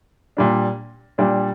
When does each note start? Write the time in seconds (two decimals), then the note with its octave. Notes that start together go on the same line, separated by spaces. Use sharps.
0.37 A#2 G3 D4
1.18 A#2 G3 D4